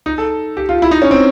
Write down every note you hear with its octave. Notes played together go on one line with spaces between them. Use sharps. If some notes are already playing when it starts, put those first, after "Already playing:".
D#4
A4
G4
F4
E4
D#4
C#4
C4